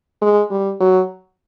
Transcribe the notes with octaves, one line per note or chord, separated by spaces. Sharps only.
G#3
G3
F#3